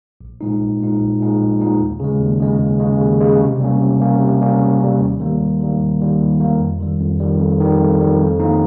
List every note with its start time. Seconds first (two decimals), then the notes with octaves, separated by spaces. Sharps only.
0.21 A#1
0.41 A#2 G#3 D#4
0.61 A#1
0.80 A#2 G#3 D#4
1.00 A#1
1.20 A#2 G#3 D#4
1.40 A#1
1.60 A#2 G#3 D#4
1.80 D#2
2.00 C#3 G#3
2.20 D#2
2.40 C#3 G#3
2.60 D#2
2.80 C#3 G#3
3.00 D#2
3.20 C#3 G#3
3.41 C3
3.60 G3 A#3 C#4
3.80 C3
4.00 G3 A#3 C#4
4.20 C3
4.41 G3 A#3 C#4
4.60 C3
4.80 G3 A#3 C#4
5.00 D#2
5.20 D#3 G3 A#3
5.41 D#2
5.60 D#3 G3 A#3
5.80 D#2
6.00 D#3 G3 A#3
6.21 D#2
6.40 D#3 G3 A#3
6.60 F2
6.80 D#3 G3
7.00 F2
7.20 D#3 G3
7.40 F2
7.60 D#3 G3
7.80 F2
8.00 D#3 G3
8.20 F2
8.40 D#3 A#3 D#4